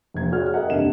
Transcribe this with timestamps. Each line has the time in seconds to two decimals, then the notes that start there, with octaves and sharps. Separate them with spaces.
0.14 F1 A#3 G#6
0.32 F#4 G#4 C#5 D5 F#5 F6
0.54 A4 A#4 D#5 E5 F#5
0.70 F#1 D#2 C3 D4 E7